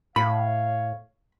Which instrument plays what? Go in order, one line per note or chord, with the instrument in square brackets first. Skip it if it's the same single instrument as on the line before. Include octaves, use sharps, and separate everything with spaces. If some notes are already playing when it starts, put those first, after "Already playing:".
[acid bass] A2 [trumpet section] C#5 F5 [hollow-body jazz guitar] B5